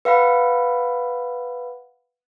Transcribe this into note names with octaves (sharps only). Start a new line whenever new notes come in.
B4 F5 F#5 B5